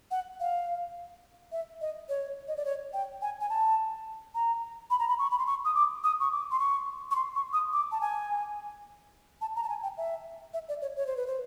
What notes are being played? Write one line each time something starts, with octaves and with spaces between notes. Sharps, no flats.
F#5
F5
E5
D#5
C#5
D#5
D5
C#5
G5
G#5
G#5
A5
A#5
B5
A#5
B5
C#6
B5
C6
C#6
D#6
D6
D#6
C#6
D6
C6
C#6
C#6
C6
C#6
D#6
D6
A5
G#5
A5
A#5
A5
G#5
G5
E5
E5
D5
C#5
C#5
C5
B4
C5